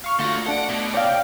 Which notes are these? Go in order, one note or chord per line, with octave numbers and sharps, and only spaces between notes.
F5 C#6 F6
D3 A3 F4 F#4 A#6
A3 D4 F#5 D7
B2
D5 F5 G5